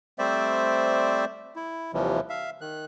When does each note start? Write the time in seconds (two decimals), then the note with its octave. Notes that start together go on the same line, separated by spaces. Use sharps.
0.19 G3 A3 C4 C5 D5 E5
1.56 E4
1.93 D#2 C3 E3 F3 G3
2.29 E5 F5
2.61 D#3 F#6